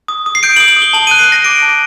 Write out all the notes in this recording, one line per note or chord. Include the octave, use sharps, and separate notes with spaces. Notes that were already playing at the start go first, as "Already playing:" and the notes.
D#6
D#6
C7
G6 D7
F#7
D#6
F#7
D#6
G7
A5 F#7
D#7
F#6
C7
F#6 A#6
D6 D7
A5